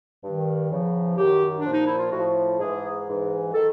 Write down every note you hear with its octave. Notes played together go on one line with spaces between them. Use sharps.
G2 D#3
E2 C#3 F3
F#2 D#3 G4
D4
A#2 F3
D#4
E4
F4
A2 F3 F#4
G#2 E3 G#4
G#2 E3
D#3 A4